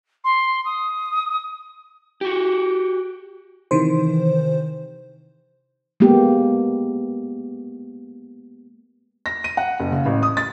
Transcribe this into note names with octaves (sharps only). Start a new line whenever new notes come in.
C6
D#6
F#4 G4
C3 D#3 E3 C5
G#3 A#3 B3 G4
A#6
D#7
F#5
F#1
C#3
A1
D#6
A6